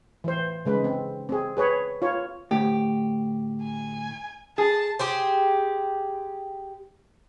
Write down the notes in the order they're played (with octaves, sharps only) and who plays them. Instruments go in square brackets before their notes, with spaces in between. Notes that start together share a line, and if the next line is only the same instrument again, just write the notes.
[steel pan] E3 C5
C#3 G#3 B4
C4
C4 G#4
G#4 B4 C#5
F4 C#5
[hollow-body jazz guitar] D2 A2 [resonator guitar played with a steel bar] G4
[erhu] G#5
[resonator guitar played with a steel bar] G#4 [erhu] A5
[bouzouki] G4 G#4 C5